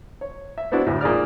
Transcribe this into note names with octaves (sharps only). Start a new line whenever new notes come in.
C#5
E5
B3 C4 D4 E4 F#4
D2 A2
A#2 D#4 G#4 D5 F6